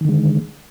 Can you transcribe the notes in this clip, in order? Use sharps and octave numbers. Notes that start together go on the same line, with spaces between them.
D3 D#3 G#3